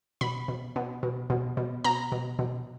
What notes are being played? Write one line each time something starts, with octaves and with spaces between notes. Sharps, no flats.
B2 B5
B2
B2
B2
B2
B2
B2 A#5
B2
B2